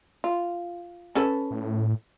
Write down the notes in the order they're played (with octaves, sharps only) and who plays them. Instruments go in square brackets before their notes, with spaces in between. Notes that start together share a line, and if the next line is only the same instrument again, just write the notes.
[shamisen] F4
C#4 A4 B4
[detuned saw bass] A2